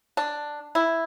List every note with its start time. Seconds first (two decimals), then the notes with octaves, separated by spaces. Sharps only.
0.17 D4
0.75 E4